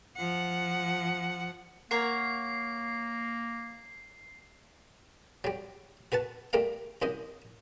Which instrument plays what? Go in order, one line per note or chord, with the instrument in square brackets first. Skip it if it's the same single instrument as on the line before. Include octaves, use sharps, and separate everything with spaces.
[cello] F3 F#5
[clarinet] A#3 [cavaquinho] A#4 C#5 F#5 [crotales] C7
[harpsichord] F#3 G3
F#4 B4 F#5 A5
G3 A3 A#4 F5
C2 F#2 D#5